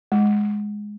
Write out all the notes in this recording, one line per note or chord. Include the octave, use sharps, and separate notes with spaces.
G#3